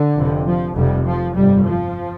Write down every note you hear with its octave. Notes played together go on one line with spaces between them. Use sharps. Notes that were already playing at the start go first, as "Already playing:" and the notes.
Already playing: D3
F1 F2 C3
F3
F1 F2 C3 G3
F3
G1 F2 C3 G3
F3